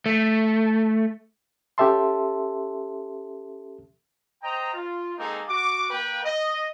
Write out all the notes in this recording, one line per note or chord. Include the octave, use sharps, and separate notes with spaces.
A3
C#4 G4 A4 E5 A5 C6
C5 D#5 G5 A#5
F4
G#3 A#3 C4 D#4 G#4 A4
F#4 D6
A#3 B4 G5
D#5